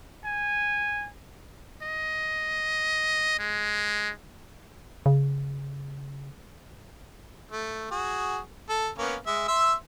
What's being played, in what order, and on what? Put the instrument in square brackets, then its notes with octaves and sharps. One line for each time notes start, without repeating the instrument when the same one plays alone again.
[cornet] G#5
[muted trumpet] D#5
G#3
[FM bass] C#3
[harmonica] A3
F#4 G#4
A4
A#3 B3 C#4
G#3 E5
E5 C6 E6